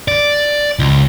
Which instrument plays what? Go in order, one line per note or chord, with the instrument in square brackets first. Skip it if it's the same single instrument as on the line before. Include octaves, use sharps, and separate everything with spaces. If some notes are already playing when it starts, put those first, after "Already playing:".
[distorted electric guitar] D5
C#2